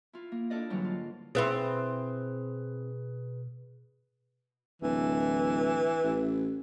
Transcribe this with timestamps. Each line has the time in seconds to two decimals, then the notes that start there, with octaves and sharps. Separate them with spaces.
0.13 E4 F4
0.32 A#3
0.50 D4 E4 A4 A#4 D5 D#5
0.70 G#2 D3 E3 F#3 G3
0.84 F4
1.35 B2 C4 E4 G#4 B4 C5
4.82 D1 E3
6.04 A1